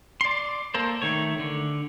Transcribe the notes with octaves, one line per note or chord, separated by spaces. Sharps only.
D5 C6
A#3 A4 A#4 C5
D#3 A3 C#5
D3